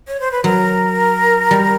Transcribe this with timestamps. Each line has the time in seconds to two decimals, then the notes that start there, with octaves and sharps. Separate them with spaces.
0.08 C#5
0.20 C5
0.32 B4
0.44 F#3 A#4
1.51 G3